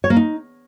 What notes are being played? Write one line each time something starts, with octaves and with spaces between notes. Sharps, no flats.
C#5
A#3
D#4